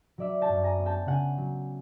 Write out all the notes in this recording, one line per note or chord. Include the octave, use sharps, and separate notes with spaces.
F#3 D5 E5
G5 A5
F#2
G#5 A#5
B3
G5 A5
C#3 F#5 G#5
F#3